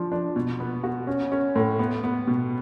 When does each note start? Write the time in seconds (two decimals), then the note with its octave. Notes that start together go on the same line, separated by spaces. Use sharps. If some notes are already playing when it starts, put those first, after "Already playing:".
Already playing: F3 D4
0.12 D4
0.36 B2
0.60 B3
0.84 F#4
1.07 C#4
1.32 C#4
1.56 A2
1.79 B3
2.04 B3
2.27 B2